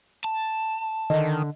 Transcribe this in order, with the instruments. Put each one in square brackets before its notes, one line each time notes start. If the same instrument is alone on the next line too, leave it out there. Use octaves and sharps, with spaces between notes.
[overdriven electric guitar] A5
[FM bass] D3 [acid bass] D#3 [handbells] D#5